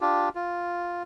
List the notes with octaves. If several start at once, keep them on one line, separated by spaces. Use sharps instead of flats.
D4 F4 G4
F4